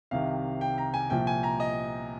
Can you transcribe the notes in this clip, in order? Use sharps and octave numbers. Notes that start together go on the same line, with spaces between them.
C2 C3 D#3 F5
G5
A#5
G#5
C2 A#2 F3 G5
G#5
A#5
D#5